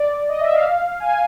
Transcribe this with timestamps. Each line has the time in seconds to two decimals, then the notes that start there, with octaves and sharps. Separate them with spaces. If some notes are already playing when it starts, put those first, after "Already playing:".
Already playing: D5
0.29 D#5
0.40 E5
0.52 F5
1.00 G#5